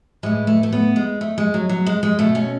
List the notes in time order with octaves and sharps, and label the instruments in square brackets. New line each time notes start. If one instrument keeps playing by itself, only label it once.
[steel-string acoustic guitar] A2 E3 G#3
A3
A3
B3
G#3
A3
G#3
F#3
F#3
G#3
G#3
B2 A3
C#4